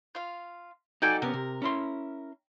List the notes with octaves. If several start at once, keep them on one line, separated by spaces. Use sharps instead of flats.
F4 F5
D#4 F#4 A4 D5 G5 G#5
C3 B3 C#4 A#4
C3
C#4 E4 C6